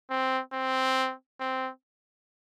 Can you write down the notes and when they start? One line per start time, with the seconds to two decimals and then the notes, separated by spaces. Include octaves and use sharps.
0.11 C4
0.53 C4
1.40 C4